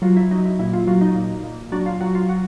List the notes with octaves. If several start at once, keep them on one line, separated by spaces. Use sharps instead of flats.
F#3 F4
E4
F#3 D#4
E4
A#2 E4
F4
F#3 F4
D#4
A#2
A#2
F#3 D4
F4
F#3 F#4
F4
F#4